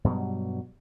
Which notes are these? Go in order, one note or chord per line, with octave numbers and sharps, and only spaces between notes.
G2 B2 F#3 G3